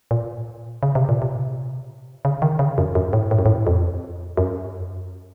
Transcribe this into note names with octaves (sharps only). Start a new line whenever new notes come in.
A#2
C#3
C3
A#2
C3
C#3
D#3
C#3
F#2
F#2
A2
A2
F#2
A2
F2
F#2